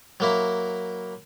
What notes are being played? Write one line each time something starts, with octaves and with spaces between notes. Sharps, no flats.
F#3 A#3 E4